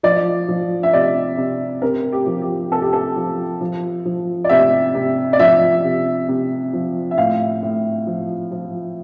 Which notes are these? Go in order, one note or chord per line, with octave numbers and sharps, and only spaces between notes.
F3 D5
F3
E5
C3 D5
C3
C3 A#4
G4
F3
G4
C3 A4
G4
A4
F3
F3
F3
D5
C3 E5
C3
D5
F3 E5
C3
C3
F3
E5
A2 F5
A2
F3
F3